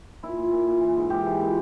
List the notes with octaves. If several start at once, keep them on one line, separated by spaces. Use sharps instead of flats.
A#2 E4
A#2
A#2
A#2
E3
G#2
G#2 G4
E3
A#2